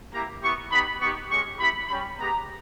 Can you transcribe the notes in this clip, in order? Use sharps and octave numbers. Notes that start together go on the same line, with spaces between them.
A#3 E4 G4 A#5
B3 E4 G4 C#6
B3 D#4 G4 B5
B3 D#4 G4 C#6
G#3 C#4 G4 C#6
B3 E4 G4 B5
G3 C#4 G4 B5
G#3 B3 G4 A#5